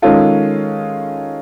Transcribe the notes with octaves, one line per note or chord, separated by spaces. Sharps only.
D#3 G#3 C#4 F4 A4